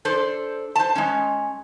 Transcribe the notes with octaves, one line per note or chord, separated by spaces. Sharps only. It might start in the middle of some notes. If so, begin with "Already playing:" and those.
D4 A4 C5
C5 A5
G#3 C#4